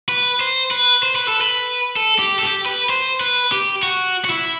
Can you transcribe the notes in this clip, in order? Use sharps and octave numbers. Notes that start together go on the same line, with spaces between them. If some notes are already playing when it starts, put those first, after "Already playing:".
B4
C5
B4
C5
B4
A4
B4
A4
G4
A4
G4
B4
C5
B4
G4
F#4
F#4
E4